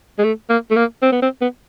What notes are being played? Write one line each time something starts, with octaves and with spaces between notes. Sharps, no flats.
G#3
A3
A#3
A3
A#3
C4
B3
C4
B3